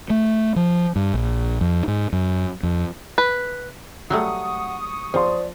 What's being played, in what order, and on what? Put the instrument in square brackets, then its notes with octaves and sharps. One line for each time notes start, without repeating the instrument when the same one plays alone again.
[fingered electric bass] A3
F3
G2
A#1
F2
G#2
F#2
F2
[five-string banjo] B4
[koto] F#3 G3 A3 [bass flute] F#5 [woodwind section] C#6 D#6
[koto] F3 [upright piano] C5 C6 [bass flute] D5